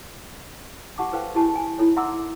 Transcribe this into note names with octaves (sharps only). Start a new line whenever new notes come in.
G4 F#5 A5 D6
A4 B4 C5 F5 G5
E4 G4 G#4 G#5 A5
G#5
D#4 E4 A4 C#5
E5 F#5 A#5 C6 D6 E6